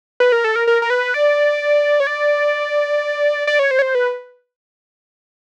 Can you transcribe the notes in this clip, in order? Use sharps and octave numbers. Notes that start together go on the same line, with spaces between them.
B4
A#4
A4
A#4
A#4
A#4
B4
D5
C#5
D5
D5
C#5
C5
C#5
C5
B4